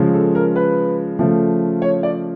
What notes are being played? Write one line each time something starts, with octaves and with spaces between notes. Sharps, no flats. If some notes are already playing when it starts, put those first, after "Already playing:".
Already playing: C#3 F3 G#3
A4
A#4
B4
C#3 F3 A3
C#5
D5